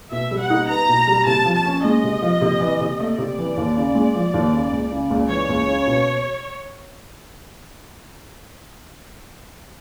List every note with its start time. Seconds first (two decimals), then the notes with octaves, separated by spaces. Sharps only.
0.11 B2 E5
0.31 G3
0.40 F#5
0.50 D#4
0.69 B3 A#5
0.89 B2
1.07 G3
1.26 C3 A5
1.45 F3
1.55 A5
1.65 C#4
1.84 G#3 D#5
2.04 C3
2.22 F3
2.41 C3
2.60 E3
2.80 C3
2.99 A3 D5
3.18 C3
3.38 E3
3.57 D#2
3.76 C#3
3.95 G#3
4.15 F3
4.34 D#2
4.53 C#3
4.73 C#2
4.92 C#3
5.11 C#2
5.29 E3 C#5
5.49 C#2
5.68 C#3
5.87 B2